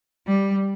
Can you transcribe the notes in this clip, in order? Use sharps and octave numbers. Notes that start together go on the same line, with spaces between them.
G3